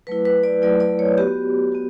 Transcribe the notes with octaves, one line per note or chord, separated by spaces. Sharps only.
F#3 A3 E4 B4
B4
D5
F#3 A3 E4 D5
D5
C#5
B3 F#4 G4
B3 F#4